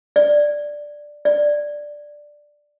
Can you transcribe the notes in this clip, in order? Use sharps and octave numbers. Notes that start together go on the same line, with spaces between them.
D5
D5